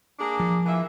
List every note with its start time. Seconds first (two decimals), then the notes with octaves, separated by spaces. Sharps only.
0.19 A#3 D4 G#4
0.40 F3
0.66 E3 A#3 E5